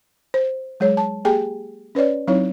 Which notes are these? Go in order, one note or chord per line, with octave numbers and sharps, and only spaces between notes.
C5
F#3 G#3 G#4 C#5
A5
A#3 G4 G#4 G5 G#5
C#4 B4 C#5 D5
F#3 C4 D#4 E4 C#5